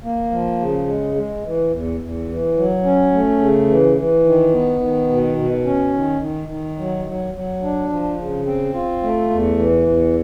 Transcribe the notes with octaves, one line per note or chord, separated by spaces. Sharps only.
A#3
F3
C#3
G#3
G#3
E3
E2
E2
E3
F#3
C#4
A3
C#3
E3
E3
D#3
B3
D#3
B2
B2
C#4
D#3
D#3
D#3
F#3
F#3
F#3
D4
F3
C#3
C4
F4
A3
E2
E3
E2